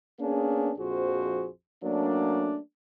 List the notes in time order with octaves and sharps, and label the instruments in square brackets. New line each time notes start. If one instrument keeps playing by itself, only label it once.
[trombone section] A#3 B3 C#4 D4 G#4
A#1 F2 F3 F#4 G#4 C5
F#3 A3 A#3 C#4 D4